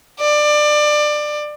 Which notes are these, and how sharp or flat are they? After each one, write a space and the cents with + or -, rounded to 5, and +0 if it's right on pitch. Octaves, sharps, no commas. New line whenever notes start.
D5 +20